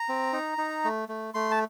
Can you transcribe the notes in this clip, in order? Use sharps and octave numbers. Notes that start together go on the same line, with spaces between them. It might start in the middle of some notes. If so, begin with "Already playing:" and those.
Already playing: A#5
C4
D#4
D#4
A3
A3
A3 C6
A5